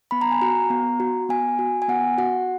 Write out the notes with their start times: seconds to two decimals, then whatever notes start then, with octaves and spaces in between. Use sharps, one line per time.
0.11 B3 B5
0.21 A#5
0.31 G#5
0.42 F#4 A#5
0.70 B3
1.00 F#4
1.29 B3 G#5
1.59 F#4
1.82 G#5
1.88 B3 F#5
2.18 F#4 F#5